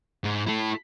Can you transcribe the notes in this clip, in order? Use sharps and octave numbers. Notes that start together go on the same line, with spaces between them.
G#2
E4 A4